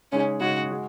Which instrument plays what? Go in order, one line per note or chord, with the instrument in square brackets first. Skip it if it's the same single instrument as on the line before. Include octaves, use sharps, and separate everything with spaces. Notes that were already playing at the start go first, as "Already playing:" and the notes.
[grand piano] C#3 G#3 D#4 G#4 [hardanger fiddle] C#4
[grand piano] C#3 G#3 D#4 G#4 [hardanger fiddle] F#4
[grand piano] G#3 F#4